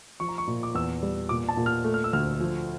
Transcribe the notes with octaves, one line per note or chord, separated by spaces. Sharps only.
F3 C#6
A#5
C#6
A#2
D6
E2 E6
G3
A#2 D6
A5
A#2
F6
A3
F6
E6
D2 F6
F3